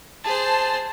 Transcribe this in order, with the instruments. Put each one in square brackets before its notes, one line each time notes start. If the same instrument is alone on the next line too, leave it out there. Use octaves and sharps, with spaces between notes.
[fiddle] G#4 C5 [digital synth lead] A5